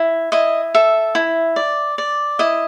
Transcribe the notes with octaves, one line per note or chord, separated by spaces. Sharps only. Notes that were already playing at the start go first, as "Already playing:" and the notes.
Already playing: E4
E4 D#5
A4 E5
E4
D5
D5
E4 D#5